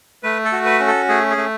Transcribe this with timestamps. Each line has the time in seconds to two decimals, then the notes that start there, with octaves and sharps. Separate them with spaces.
0.23 A3 B4
0.45 A4
0.52 F#4
0.65 B4
0.80 C#4
0.87 A4
1.08 A3 G#4
1.30 G#4
1.37 A3